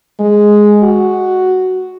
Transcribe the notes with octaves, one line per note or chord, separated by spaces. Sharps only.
G#3
F#4